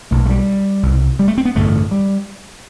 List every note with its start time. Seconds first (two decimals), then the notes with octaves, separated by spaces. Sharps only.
0.11 B1 B2 A3
0.25 A3
0.29 G3
0.83 C2 B2
1.19 G3
1.28 A3
1.38 C4
1.45 B3
1.55 A1 G2 D3 A3
1.91 G3